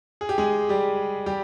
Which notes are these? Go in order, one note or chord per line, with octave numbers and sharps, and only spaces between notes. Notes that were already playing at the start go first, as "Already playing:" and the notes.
G#4
G4
G#3 G#4
G3 G4
G3 G4